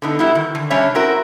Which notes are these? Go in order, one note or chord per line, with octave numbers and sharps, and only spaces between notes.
D3 B3 D#4
G3 B3 E4 F#4
D#3
D3
C3 G3 C#4 D4 C#5 E5
C4 C#4 E4 F#4 A#4